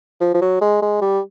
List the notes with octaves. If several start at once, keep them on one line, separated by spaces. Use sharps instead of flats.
F3
F3
F#3
G#3
G#3
G3